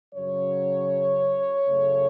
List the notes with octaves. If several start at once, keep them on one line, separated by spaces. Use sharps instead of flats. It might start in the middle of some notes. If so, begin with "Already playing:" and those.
F#2 C#3 F#3 C#5
F#2 C#3 A3